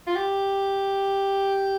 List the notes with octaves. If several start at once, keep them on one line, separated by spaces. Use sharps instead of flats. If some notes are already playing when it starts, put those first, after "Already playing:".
F4
G4